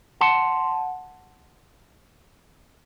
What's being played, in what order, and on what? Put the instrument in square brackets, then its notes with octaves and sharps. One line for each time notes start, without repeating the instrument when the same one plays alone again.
[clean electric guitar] F#5 A5 C6